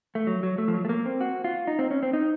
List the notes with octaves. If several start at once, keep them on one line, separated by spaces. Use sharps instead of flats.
A3
F#3
F#3
A3
F3
F#3
A3
A#3
C4
F#4
F4
D#4
C4
C#4
C4
D#4